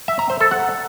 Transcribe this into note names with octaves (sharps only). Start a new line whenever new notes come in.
E5
A#5
C5
A4
F#5